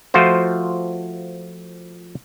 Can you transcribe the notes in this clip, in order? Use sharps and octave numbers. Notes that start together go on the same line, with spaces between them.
F3 A3 F4 F#4 C5